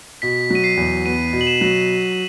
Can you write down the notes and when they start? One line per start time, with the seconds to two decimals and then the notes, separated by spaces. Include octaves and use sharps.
0.22 B2 B6
0.50 F#3 D#7
0.64 C7
0.77 E2
1.06 B3 D#7
1.33 B2
1.41 F#7
1.47 E7
1.61 F#3